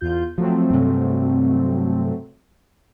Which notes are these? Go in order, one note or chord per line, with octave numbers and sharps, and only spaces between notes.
E2 F4 G6
F3 F#3 A3 C4
G2 C3